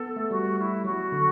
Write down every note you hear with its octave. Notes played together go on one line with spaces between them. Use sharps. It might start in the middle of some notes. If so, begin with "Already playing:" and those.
Already playing: B3 A4
A3
G3 F#4
F#4
E4
F#3 F#4
D3